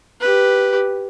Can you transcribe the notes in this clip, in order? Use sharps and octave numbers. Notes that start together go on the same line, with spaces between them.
G4 B4